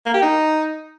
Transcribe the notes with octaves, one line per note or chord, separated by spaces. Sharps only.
A#3
G4
D#4